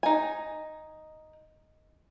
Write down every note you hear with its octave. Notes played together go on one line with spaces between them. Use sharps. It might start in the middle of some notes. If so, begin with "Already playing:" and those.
D#4 G#5